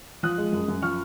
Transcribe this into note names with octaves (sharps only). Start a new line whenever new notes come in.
F3 D#6 F#6
G#3
F#2
F#2
F3 C#6 F6